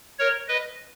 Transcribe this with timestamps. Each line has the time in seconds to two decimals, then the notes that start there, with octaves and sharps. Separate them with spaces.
0.19 A#4 C#5
0.48 B4 D#5